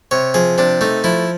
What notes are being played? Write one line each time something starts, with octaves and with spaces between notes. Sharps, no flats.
C3 C#5
F3 G#4
C3 D4
A3 D#4
F3 E4